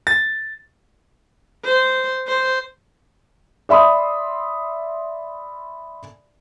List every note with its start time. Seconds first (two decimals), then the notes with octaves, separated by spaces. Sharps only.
0.07 A6
1.65 C5
2.28 C5
3.69 D5 E5 B5 C6 D#6